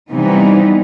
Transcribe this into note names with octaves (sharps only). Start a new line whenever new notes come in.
C3 E3 G3 B3 D#4